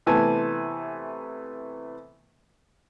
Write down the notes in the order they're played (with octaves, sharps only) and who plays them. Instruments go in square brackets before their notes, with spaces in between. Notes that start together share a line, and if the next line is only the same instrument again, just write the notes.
[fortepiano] C3 E3 A3 B3 G#5 A5